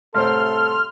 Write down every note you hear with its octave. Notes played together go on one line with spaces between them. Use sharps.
C2 A2 A4 C5 C6 F6